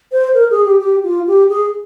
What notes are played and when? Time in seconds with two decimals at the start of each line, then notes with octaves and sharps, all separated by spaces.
0.12 C5
0.34 A#4
0.51 G#4
0.65 G4
0.80 G4
1.04 F4
1.27 G4
1.50 G#4